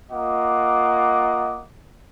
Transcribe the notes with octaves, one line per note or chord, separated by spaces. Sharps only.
A#3 F4 D#5 F#5 D6